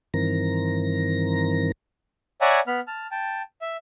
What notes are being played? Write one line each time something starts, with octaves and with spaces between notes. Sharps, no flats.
G2 D#3 E3 C4 A#4 A#6
C#5 D5 E5 F#5 G#5 A#5
B3 B5 F6
A5 F6
G5 A5
E5